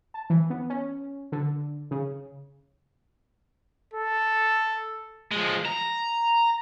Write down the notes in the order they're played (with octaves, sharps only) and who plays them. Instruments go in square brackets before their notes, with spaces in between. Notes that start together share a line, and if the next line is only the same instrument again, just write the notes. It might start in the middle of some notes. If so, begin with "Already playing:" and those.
[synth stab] A5
E3
B3
C#4
D3
C#3
[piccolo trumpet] A4
[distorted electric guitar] F3 G#3
A#5